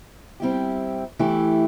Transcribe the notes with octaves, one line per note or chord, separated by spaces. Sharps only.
G3 C4 E4 G4
E3 A3 E4 G4